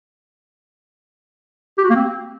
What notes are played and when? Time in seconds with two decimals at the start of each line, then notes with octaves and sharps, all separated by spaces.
1.78 G4
1.84 F#4
1.90 A#3
1.96 C4